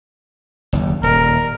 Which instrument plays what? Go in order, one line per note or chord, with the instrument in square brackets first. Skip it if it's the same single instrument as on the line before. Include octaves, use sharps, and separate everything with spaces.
[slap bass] F#1 D#2
[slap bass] D#1 [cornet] A#4